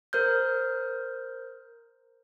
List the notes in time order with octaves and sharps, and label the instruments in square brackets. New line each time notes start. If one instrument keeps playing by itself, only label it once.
[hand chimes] A#4 C5 F6 G6